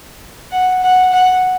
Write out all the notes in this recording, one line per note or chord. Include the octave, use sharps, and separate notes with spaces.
F#5
F#5
F#5